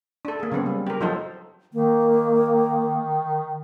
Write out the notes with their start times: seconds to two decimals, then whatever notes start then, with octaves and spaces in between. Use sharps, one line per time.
0.25 D4 A4
0.40 A#3 G#4
0.52 C#3 F#3 B3 C4
0.66 G3
0.87 G4 A#4
1.01 F3 F#3 D#4 A4 C5
1.74 D#3 A#3